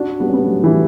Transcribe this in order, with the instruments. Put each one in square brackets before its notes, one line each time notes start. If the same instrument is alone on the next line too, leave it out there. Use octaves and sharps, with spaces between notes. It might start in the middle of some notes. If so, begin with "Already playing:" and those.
Already playing: [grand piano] D4 F#4
G3 B3
C#4
G3 B3
F#3 A3
E3 G3